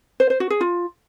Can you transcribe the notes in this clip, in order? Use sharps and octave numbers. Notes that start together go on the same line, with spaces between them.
C5
C5
F#4
G#4
F4